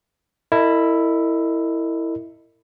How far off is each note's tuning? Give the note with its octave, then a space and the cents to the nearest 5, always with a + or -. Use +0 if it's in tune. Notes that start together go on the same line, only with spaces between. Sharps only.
E4 +0 A#4 -45 D#5 -20